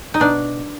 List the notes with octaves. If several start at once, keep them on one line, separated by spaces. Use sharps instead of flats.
D#4
B2 D4